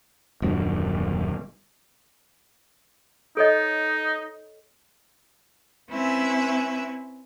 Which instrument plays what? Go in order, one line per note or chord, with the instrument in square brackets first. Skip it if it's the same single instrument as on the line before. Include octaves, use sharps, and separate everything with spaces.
[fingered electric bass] D#1 F#2 D3
[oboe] D#4 [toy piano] A4 C#5 D#5
[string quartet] C4 C#4 E4 B4 E5 G#5